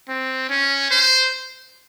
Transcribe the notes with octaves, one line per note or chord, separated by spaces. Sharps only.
C4
C#4
C5